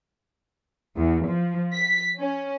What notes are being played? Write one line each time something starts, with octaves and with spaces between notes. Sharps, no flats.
E2
F3
B6
C#4